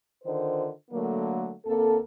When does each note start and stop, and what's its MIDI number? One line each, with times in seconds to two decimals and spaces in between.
0.24 0.68 50
0.24 0.68 51
0.24 0.68 65
0.24 0.68 72
0.91 1.51 50
0.91 1.51 54
0.91 1.51 57
0.91 1.51 58
1.66 1.98 38
1.66 1.98 58
1.66 1.98 60
1.66 1.98 69